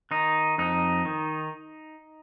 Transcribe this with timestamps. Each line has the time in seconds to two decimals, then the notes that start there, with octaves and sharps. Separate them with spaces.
0.11 D#3 D#4
0.58 F2 D#4
1.05 D#3